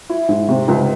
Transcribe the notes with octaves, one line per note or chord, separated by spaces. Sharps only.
E4
G#2
C3
C#2